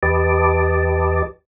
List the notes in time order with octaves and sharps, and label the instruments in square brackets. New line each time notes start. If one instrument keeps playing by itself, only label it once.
[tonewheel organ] E2 G4 B4 D#5 A5 D6